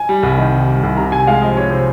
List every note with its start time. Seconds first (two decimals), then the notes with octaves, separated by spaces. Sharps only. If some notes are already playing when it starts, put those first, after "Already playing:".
Already playing: G#5
0.09 G3
0.23 C2
0.38 D#3
0.52 C3
0.68 G3
0.83 C2
0.97 C3 A#5
1.12 C3 G#5
1.27 G#3 F5
1.42 F3 D#5
1.56 C3 C#5
1.71 C3 C5